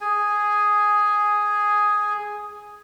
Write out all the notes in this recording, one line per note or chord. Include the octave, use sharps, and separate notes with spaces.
G#4 G#5